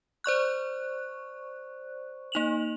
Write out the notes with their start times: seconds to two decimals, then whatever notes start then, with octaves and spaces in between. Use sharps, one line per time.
0.24 C5 D5 C#6 F#6
2.32 A#3 D#4 F7 F#7